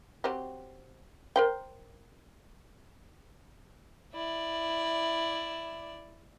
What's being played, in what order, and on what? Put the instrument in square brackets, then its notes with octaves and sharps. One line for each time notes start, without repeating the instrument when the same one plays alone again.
[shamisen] F#3 C4 G4
A#4 C5 G5
[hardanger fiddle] E4 D5